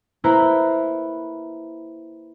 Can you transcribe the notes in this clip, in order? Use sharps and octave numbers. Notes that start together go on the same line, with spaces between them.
A#3 E4 B4 C5 A#5